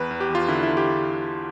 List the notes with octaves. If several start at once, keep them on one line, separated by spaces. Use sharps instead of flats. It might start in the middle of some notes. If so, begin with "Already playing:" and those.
Already playing: E2 B4
E2
G4
E2 F4
D3 E4
D3 E4
G4